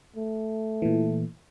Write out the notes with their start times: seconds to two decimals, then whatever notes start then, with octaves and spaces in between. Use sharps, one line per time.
0.16 A3
0.82 A#2 E3